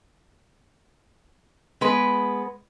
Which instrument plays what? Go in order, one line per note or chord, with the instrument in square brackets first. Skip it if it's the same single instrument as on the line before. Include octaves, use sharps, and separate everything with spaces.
[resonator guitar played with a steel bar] G#3 B3 B4